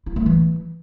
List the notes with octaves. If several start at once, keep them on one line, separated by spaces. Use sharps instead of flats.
E4
A3
E3